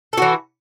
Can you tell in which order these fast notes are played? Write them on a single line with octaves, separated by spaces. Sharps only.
A4 F#4 E3